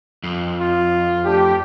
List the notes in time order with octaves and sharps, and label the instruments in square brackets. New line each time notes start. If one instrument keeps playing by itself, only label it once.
[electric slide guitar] F2
[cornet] F4
[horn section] A3 D4 G4